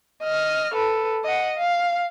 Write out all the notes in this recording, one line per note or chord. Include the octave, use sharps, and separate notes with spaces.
D#5 F6
A4 B4
D#5 F#5
F5